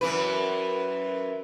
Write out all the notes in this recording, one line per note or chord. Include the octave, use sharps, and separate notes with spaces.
F#2 E3 B4